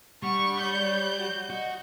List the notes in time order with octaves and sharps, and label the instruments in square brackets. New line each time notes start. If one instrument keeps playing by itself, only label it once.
[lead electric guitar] G3 [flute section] D4 F#5 [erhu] C#6
[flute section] C#5 D5 [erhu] G6
[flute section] F#4
[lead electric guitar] F#4 [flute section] D#5